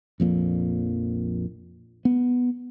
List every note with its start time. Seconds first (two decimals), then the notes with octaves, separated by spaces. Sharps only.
0.20 A#1 F2 A#2
2.05 B3